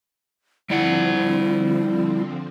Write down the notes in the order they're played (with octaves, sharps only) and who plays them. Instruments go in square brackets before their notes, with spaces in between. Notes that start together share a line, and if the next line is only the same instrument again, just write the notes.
[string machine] D3 F3 C4 [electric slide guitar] G3 D5 F#5 [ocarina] E4